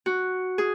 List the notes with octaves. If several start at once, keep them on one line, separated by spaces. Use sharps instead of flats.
F#4
G#4